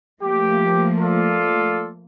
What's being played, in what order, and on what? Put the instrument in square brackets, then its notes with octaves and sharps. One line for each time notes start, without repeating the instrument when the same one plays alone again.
[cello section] F3 A3 A#3 [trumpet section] G4
[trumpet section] F4 A4 D5